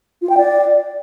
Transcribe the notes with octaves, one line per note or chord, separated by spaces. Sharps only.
F4
G5
D5